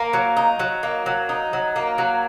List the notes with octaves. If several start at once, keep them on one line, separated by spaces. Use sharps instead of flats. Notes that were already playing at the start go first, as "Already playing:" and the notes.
Already playing: A#3
F#3
D#4
F#3
A#3
F#3
D#4
F#3
A#3
F#3